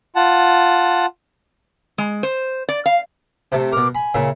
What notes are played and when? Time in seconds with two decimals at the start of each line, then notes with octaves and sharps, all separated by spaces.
0.16 F4 F#5 A5
1.98 G#3
2.23 C5
2.69 D5
2.86 F5
3.52 C3 A3
3.72 B2 A#4 D6
3.95 G#5 B5
4.14 A#2 C#3 E5